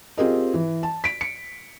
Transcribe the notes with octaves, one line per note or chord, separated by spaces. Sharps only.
C4 F4 G4 G#4 A#4 D#5
E3
A5
B6 D7
C#7